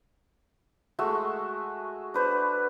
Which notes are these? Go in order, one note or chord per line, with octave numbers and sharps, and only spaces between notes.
G#3 A3 F#4 E5
D4 B4 C5